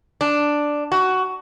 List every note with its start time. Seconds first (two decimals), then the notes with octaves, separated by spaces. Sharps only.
0.21 D4
0.92 F#4